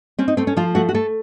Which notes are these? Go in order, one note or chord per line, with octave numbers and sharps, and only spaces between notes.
C4 C#4
D#4
A3 C4
C#4
F3 F4
A3 F#4
F#4
A3 A4